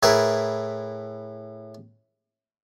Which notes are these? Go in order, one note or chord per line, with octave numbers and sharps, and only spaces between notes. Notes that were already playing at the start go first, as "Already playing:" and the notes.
A2 E4 G#4 A#4 B4